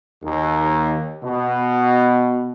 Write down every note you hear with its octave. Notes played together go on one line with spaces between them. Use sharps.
D#2
B2